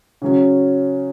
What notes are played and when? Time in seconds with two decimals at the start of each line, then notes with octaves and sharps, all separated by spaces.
0.22 C#3 F#3 C#4